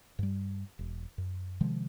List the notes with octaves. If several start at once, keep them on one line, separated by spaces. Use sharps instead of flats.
G2 G3
E1
F#2
C3 D#3 F3 G#3